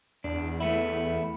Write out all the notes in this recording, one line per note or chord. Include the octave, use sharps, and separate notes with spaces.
E2 D4
A3 B3 E4